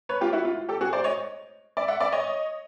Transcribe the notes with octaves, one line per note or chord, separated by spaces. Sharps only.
B4 C#5
F4 G4
E4 F#4
F4
G4 A4
F#4 G#4
C5 D5
C#5 D#5
D5 E5
E5 F#5
D5 E5
C#5 D#5